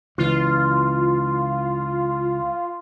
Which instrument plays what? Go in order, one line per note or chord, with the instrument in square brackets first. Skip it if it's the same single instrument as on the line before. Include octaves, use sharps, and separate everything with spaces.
[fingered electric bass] C#2 E3 [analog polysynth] F4